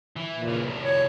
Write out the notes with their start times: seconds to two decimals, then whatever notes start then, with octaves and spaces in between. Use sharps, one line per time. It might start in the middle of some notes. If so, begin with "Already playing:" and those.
0.16 E3
0.33 A#2
0.48 C#3 E3
0.64 C2 A2
0.85 C#5